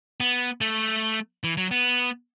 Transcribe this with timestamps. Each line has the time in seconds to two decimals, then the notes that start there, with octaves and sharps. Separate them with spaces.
0.20 B3
0.61 A3
1.44 E3
1.57 F#3
1.71 B3